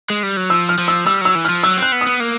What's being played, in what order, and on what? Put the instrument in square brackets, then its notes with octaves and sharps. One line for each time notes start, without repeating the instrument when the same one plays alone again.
[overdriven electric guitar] G#3
G3
F#3
[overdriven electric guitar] F3 [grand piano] E6
[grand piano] F6
[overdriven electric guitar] F3
[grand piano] E6
[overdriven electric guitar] G3 [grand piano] E6
[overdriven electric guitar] F#3 [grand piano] E6
[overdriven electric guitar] E3
[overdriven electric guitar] F3 [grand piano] F6
[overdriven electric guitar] F#3 [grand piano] E6
[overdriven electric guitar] C4
[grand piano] F#6
[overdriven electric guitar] B3
[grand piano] D#6
[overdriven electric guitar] B3
A#3